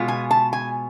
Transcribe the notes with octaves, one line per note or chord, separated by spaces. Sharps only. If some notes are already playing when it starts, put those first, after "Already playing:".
Already playing: B2 G#3 B3 F4
G#5
A5
G#5